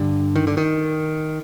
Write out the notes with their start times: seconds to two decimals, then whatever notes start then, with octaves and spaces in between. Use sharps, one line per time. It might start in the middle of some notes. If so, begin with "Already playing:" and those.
Already playing: G2 D3
0.36 D#3
0.47 D3
0.57 D#3